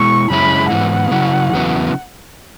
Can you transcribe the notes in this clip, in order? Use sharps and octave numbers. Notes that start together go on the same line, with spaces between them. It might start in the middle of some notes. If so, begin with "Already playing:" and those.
Already playing: B2 G#3 E4 C#6
F#2 C#3 G#3 C#4 E4 B5
G#2 E3 B3 E4 F#5
C#3 F#3 E4
E2 C#3 F#3 B3 E4